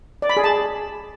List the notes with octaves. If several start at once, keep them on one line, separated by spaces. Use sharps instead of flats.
D5
B5
G#4
A5